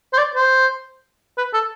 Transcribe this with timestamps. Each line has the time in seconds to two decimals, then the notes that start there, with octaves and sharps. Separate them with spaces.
0.13 C5
0.18 D5
0.36 C5
1.37 B4
1.54 A4